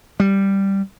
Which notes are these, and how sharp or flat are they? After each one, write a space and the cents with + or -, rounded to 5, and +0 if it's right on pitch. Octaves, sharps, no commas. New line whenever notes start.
G3 +0